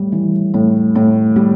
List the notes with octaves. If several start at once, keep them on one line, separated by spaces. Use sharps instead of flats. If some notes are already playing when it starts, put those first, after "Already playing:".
Already playing: A2 G3
E3
A2
A2
G3